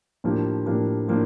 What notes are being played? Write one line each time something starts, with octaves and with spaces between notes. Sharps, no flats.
A2 F3 A#3 D4 G4
A2 F3 A#3 D4 G4
A2 F3 A#3 D4